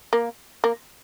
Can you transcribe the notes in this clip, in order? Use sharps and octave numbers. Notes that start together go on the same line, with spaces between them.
A#3
A#3